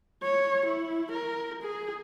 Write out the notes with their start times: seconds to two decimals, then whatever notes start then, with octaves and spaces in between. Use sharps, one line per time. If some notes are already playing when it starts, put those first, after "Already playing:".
0.23 C#5
0.66 E4
1.11 A#4
1.62 G#4